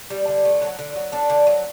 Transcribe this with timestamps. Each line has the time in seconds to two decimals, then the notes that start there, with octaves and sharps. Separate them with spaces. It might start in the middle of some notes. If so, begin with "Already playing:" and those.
0.10 G3
0.27 D3
0.45 A3
0.62 F#3
0.79 D3
0.96 F#3
1.12 A3 D4
1.30 D3
1.47 F#3